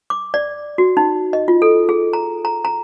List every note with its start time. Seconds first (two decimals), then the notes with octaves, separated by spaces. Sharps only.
0.10 D6
0.34 D5
0.78 F#4
0.97 D#4
1.33 D#5
1.48 F4
1.62 A4
1.89 G#4
2.13 A#5
2.45 A#5
2.65 A#5